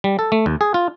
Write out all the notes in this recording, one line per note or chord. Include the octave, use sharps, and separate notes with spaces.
G3
A4
A3
D#2
G#4
F4